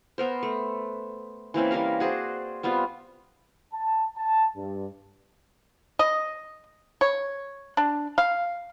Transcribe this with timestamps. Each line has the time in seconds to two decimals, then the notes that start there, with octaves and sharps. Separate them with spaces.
0.18 B3 A#4 C5
0.43 A3
1.54 E3 A#3 C4 C#4
1.71 E3 G3 A#4 F5
2.00 F#4 G#4 C5 D5
2.63 G3 B3 C4 F4
3.71 A5
4.15 A5
4.55 G2
5.99 D#5
7.01 C#5
7.77 D4
8.18 F5